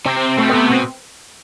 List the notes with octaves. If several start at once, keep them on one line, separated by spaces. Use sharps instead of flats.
C3 C4
C4
B2 A3
B3
C3
B3
B2 C4